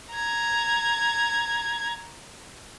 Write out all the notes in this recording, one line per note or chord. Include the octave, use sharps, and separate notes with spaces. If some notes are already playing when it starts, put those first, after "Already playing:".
A#5 G#6